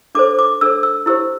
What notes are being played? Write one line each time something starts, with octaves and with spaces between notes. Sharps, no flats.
D4 A4 C5 D6
D6
D4 A4 C5 E6
E6
E4 G4 C5 E6